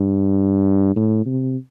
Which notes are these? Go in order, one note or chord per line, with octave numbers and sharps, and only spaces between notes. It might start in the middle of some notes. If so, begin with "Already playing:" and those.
Already playing: G2
A2
C3